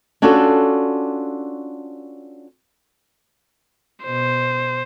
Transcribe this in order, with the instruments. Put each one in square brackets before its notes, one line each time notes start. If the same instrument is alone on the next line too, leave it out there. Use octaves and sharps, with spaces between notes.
[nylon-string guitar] C#4 D4 F4 F#4 A4
[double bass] B2 [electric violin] C5